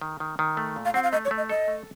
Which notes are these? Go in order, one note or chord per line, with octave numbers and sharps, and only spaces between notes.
D#3
D#3
D#3
A3
A#2
F5
C4 F#5
F5
A3 D#5
C#5
A3
D#5
A4 D#5
A3